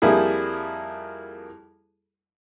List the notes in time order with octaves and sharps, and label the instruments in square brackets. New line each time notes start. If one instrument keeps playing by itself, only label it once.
[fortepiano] F2 G3 A#3 E4 G#4